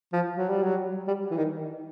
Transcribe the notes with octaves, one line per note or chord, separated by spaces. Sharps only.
F3
F#3
G3
F#3
G3
E3
D#3